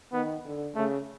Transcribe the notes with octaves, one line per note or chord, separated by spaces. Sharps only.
D#3 B3
D3
C#3 A3